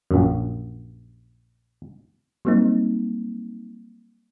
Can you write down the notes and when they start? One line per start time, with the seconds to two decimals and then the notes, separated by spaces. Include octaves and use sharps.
0.11 A#1 F#2
2.45 F#3 G3 A#3 C4 D#4